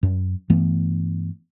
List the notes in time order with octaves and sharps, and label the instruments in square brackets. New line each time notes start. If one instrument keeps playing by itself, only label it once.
[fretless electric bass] F#2
G2 E3 A3 B3